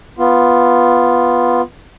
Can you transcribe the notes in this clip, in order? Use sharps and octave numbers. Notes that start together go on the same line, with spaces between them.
B3 F4